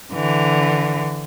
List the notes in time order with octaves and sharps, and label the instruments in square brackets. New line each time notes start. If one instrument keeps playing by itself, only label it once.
[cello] D3 E3